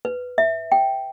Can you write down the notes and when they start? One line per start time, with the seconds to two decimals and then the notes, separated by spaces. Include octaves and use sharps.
0.05 B4
0.38 E5
0.72 G5